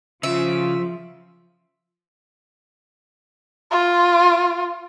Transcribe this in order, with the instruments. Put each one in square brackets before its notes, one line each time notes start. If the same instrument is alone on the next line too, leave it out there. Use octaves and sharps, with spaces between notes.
[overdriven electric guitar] C#3 [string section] F3 [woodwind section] F4 [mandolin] E5
[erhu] F4